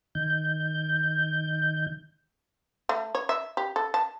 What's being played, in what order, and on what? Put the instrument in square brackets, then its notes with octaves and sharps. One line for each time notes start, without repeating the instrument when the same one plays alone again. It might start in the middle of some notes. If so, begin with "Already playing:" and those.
[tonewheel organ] D#3 G6
[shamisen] A3
C#5
E5
G4
A4
A5